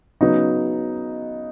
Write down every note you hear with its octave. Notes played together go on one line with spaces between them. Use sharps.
C#3 F#3 B3 D#4